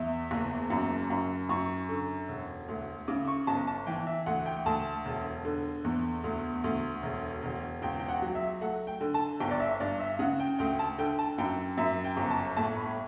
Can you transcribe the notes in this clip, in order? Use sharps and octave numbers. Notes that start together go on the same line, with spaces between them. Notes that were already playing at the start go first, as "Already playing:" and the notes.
Already playing: E2 E5
F#1
F#2
F#2
F#2 C#6
D3
E1
D2
C#3 D6
C#6
G1 A5
A5
E3 G5
E5
D2 F#5
G5
D2 A5
E1
D3
E2
D2
D2
E1
E1
C#2 G5
G5
F#5
F#3
E5
A3 F#5
G5
D3
A5
G1 G5
D5
E5
G2 D5
E5
C#3 F#5
G5
D2 G5
A5
D3 G5
A5
F#2 G5
F#2 E5
G5
G1
A5
A2 A5
B5